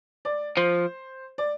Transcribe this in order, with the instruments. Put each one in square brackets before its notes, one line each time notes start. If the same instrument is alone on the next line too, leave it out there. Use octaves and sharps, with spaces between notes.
[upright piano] D5
[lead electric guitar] F3 [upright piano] C5
[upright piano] D5